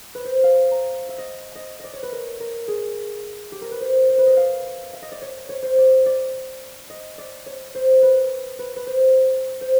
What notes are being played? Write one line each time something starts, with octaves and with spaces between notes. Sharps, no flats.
B4
C5
F5
A#5
E5
D#5
D#5
D5 D#5
C#5
B4
A#4
A#4
G#4
G4
A#4
B4
C5
C5
B4
D#5
F5
E5
D#5
D5
C#5
C#5
C5
D5
D5
D#5
D5
C#5
C5
B4
B4
B4
C5
C5